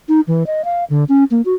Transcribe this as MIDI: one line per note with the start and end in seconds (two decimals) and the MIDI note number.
0.09 0.21 63
0.28 0.46 52
0.47 0.64 75
0.65 0.84 77
0.90 1.04 50
1.09 1.24 61
1.31 1.42 58
1.45 1.54 66